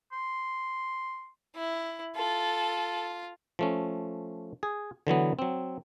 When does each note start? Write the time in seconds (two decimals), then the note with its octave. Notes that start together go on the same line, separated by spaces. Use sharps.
0.12 C6
1.55 E4
2.16 F4 A4
3.59 F3 A3 C#4
4.63 G#4
5.07 D3 E3 F#3 B3
5.39 F#3 C4